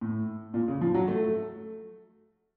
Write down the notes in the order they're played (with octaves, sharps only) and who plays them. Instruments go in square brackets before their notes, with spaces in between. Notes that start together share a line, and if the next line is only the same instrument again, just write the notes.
[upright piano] A2
A#2
C#3
F3
F#3
A3